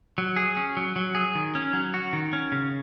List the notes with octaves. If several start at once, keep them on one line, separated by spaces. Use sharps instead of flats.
F#3
G#4
C#4
F#3
F#3
G#4
D#3
C#4
F#3
F#4
D#3
C#4
C#3